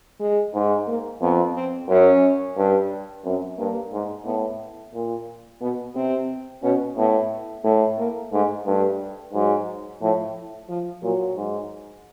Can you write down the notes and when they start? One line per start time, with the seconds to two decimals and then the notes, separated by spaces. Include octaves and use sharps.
0.20 G#3
0.54 G#2
0.87 A#3
1.21 F2 B3
1.55 C4
1.89 F#2 C#4
2.56 G2
3.25 F#2 C4
3.58 G2 A#3
3.93 G#2
4.25 A2 B3
4.94 A#2
5.61 B2 B3
5.95 C3 C4
6.62 B2 C#4
6.97 A2 B3
7.64 A2 A3
7.98 A#3
8.32 G#2 A3
8.66 G2 A3
9.33 G#2 F#3
10.01 A2 F3
10.69 F3
11.03 A#2 F#3
11.36 G#2